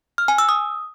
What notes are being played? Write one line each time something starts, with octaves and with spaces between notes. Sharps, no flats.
F6
G#5
E6
D#6